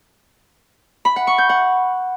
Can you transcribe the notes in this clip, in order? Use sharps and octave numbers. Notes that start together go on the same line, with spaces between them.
B5
F#5
C#6
G6
F#5